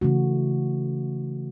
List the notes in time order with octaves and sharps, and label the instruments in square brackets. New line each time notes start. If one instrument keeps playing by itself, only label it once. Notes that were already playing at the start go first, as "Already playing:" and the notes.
[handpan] C#3 E3 A3 F#4